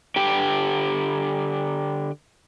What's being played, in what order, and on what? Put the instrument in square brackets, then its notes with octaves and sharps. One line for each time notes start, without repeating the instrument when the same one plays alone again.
[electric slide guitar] D3 G4 B4 G5